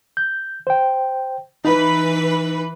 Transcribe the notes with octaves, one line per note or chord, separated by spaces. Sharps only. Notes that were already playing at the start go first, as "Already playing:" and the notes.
G6
C5 G5
E3 D#4 B4